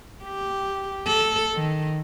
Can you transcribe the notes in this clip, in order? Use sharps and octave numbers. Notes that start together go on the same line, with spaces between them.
G4
A4
D#3